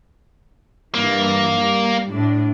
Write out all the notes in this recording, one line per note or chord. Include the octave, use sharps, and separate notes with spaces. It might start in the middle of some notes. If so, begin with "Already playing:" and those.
G2 E3 A#3
G3
A2 D4